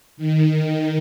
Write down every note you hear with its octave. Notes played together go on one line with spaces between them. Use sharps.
D#3